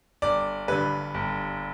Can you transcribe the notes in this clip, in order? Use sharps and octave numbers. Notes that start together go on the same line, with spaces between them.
G1 D5
G2 D3 B4
G1